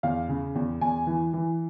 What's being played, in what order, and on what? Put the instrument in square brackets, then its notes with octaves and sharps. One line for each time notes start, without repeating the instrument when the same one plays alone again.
[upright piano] E2 F5
C#3
E2
E2 G#5
E3
E3